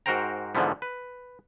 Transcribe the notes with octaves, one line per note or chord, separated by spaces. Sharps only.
G#2 F#4 A#4 C5 G5 A#5
G#2 D3 E3 F3 B3
B4